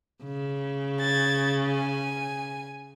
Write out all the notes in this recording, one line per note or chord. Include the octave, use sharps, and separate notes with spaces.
C#3
G#6 A6
G#5